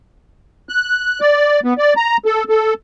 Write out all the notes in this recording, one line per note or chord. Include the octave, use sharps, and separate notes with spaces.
F#6
D5
B3
D5
A#5
A4
A4